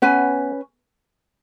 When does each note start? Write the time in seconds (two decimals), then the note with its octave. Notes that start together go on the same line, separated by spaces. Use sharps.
0.02 B3 C#4 B4 G#5